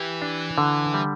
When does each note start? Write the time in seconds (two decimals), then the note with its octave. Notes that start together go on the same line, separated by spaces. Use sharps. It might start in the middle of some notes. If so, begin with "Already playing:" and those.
Already playing: E3 G4
0.22 D4
0.58 D3
0.94 G3